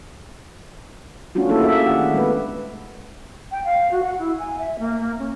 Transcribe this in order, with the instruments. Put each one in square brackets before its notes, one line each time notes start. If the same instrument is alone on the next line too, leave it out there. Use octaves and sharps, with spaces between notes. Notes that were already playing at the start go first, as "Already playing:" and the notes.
[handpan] A3 C#4 D4 F4 F#4
A#3 D4 E4 G#4 A4
G4 E5
D#3 D4 F#5
A3
G#3 B3 B4
[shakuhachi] G5
F5
F#4
F#5
E4
G#5
E5
A#3
A#3
C#4